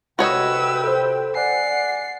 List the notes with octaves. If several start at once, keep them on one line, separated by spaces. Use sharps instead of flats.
D2 C3 F#4 B4 C#5 D#5 G5 E6
A4 C5
D5 F#5 G#5 C7